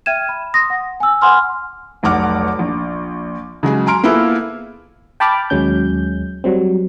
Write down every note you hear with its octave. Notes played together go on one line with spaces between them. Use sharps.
E5 G5 F6 G#6 D#7 E7
B5
C6 D#6 A#6
F#5
G#5 E6
F#5 G#5 B5 C6 D6 F6
F1 B1 F#5 D6 F6
A#1
C#3 F#3 G#3 G#4
G#5 A#5 C6 F6 D7
A#3 B3 E4 F4 G#4 A4
G5 A5 B5 D6 F6
D#2 F#3 G#3 C#4 G6
F#3 G3 C4